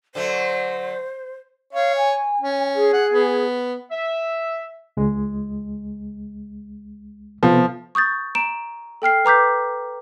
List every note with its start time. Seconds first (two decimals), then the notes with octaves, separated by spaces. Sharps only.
0.15 D3 F#3 A3 C5
1.73 C#5 F5
1.96 G#5
2.41 C#4
2.75 G#4
2.93 F#5
3.12 B3
3.91 E5
4.97 C#2 G#3
7.43 C3 F3 B3 A4
7.95 C#6 D#6 G6 A6
8.35 A#5 D7 E7
9.02 A4 G5 F6 C7
9.25 B4 A#5 D6 G6 B6